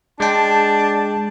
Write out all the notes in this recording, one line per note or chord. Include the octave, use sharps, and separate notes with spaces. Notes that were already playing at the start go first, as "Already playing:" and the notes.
G#3 D4 G5 A5